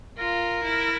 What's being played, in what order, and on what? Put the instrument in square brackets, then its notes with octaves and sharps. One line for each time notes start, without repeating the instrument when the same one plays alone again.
[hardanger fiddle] F4 [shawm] A#4
[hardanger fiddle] E4